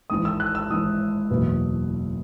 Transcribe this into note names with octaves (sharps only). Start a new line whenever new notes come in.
G#1 G#2 E3 D#6
E6
F#6
E6
G#1 G#2 E3 D#6
F#1 E2 B2 F#3 B3